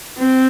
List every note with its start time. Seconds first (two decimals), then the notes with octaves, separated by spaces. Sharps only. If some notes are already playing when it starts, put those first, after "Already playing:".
0.18 C4